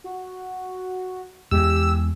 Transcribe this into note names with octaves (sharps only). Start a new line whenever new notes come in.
F#4
E2 G#3 G4 E6